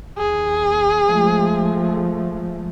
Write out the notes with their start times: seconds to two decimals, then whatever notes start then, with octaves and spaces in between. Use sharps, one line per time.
0.18 D#2 G#4
1.05 F3 G#3 A3